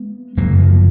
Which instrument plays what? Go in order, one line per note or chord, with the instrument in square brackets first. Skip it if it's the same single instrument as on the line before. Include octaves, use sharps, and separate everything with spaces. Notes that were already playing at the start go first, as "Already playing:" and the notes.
Already playing: [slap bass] G#3 B3
F#2 C#3 F#3 A#3
F3